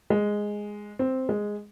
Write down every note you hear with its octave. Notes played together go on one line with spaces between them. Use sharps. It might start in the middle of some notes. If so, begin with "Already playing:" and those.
G#3
C4
G#3